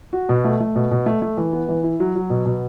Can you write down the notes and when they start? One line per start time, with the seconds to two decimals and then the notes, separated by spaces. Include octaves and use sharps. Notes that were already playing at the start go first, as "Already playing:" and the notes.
0.13 F#4
0.29 B2
0.45 A3
0.60 A3
0.76 B2
0.91 B2
1.06 A3
1.22 A3
1.37 E3
1.53 B3
1.69 E3
1.83 E4
2.00 F#3
2.15 F#3
2.30 B2
2.46 B2